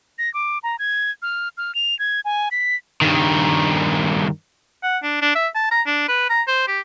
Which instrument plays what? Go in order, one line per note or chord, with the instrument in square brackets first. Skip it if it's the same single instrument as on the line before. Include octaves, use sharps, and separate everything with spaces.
[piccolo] A#6
D6
A#5
G#6
F6
F6
F7
G#6
G#5
B6
[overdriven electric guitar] G2 D#3
[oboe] F#5
D4
D4
E5
A5
A#5
D4
B4
A#5
C5
G4